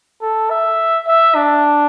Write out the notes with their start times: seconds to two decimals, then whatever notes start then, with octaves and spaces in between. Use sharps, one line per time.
0.22 A4
0.50 E5
1.07 E5
1.35 D4